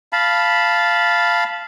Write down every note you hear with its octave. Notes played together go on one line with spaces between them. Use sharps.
F5 A5 B5